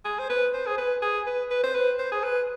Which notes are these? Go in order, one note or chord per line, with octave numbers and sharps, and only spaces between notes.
G#4
C5
B4
C5
G#4
B4
G#4
B4
B4
C5
B4
C5
G#4
B4